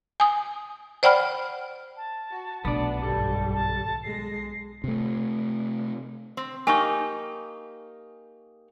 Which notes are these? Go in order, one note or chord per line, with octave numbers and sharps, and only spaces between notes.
G#5 D#6
C5 D5 F#5 G5 B5 F6
A5
F#4
B1 A2 B3 D4 D5
G#1 G2 G3 A4
A5
B1 G#3 A#6 C7
C3 A3
C4
A#3 D#4 G4 G#5 C#6